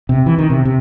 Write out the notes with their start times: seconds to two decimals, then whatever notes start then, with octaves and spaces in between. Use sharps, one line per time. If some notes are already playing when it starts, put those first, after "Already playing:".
0.09 C3
0.26 E3
0.38 D#3
0.50 C3
0.65 C3